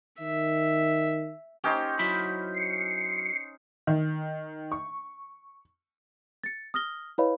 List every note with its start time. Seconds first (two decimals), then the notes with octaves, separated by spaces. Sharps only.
0.21 D#3 E5
1.64 C#4 D#4 G4 C5
1.99 F#3 E4 B5
2.55 C7 C#7
3.87 D#3
4.72 C#6
6.44 A6 C#7
6.74 D#6 F6 A#6 G7
7.18 E4 B4 C#5 D#5 F5 B5